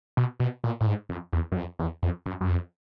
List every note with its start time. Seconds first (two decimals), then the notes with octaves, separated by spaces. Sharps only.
0.17 B2
0.40 B2
0.64 A#2
0.81 A2
0.86 G#2
1.09 F2
1.33 E2
1.52 F#2
1.56 F2
1.79 E2
2.03 F2
2.26 F#2
2.41 F#2
2.49 F2